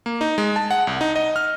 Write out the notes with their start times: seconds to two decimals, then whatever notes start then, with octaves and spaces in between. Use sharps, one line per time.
0.06 A#3
0.21 D#4
0.38 G#3
0.56 A5
0.71 F#5
0.87 C2
1.01 D#4
1.16 D#5
1.36 F6